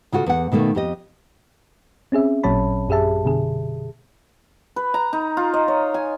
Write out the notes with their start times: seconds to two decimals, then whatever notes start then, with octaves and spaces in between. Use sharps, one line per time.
0.12 C#3 F4 F#4 A4
0.26 E2 F#5
0.52 B2 D#3 A3 A#3
0.75 F2 G4 D#5
2.12 C4 C#4 G#4 E5
2.43 A1 A#2 F#3 C#5 A5 B5
2.89 F#2 G4 G#4 E5 A5
3.25 B2 D3 G#4
4.76 B4
4.94 A#5
5.13 D#4
5.37 F4
5.54 D#5
5.68 C#5
5.94 G#5